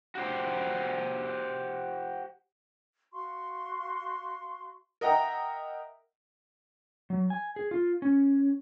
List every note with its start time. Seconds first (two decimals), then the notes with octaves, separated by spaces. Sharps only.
0.15 F#4 G4 C5
3.13 F#4 F5 C6 C#6
5.01 A#4 D#5 E5 F#5 G5 A#5
7.10 F#3
7.30 G#5
7.56 G#4
7.71 F4
8.02 C#4